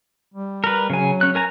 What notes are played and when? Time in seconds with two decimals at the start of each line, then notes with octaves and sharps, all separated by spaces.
0.34 G3
0.64 A#4 B4
0.90 C#3 F#3 G#5
1.21 C#4 F#6
1.35 A#4 G#5 A#5